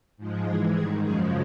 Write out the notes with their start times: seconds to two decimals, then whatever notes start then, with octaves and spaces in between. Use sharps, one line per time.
0.17 G#2 F3 G#3
0.45 G#2 E3 G#3 G#4
0.73 G#2 D#3 G3 G#4
1.02 F#2 C#3 F3 G#3 G#4